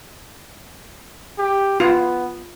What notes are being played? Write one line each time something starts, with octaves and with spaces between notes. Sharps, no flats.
G4
B3 F4